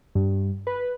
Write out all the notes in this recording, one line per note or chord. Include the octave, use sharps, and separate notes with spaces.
G2
B4